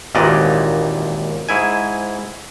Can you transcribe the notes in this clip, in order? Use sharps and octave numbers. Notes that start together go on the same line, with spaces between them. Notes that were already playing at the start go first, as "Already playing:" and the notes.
G#1 D#2 A#2 E3 D5 D#5
G#2 E4 G#5